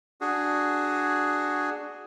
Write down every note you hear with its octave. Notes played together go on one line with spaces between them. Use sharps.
D4 F#4 G#4